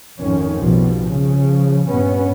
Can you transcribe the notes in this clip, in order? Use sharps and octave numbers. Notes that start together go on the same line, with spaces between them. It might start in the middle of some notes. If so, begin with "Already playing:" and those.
G#1 F2 D#3 C#4
B1 B2 F3 G3
C#3 F3
G2 A#2 B3 C#4